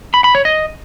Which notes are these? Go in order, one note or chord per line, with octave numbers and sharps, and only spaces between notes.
B5
B5
C#5
D#5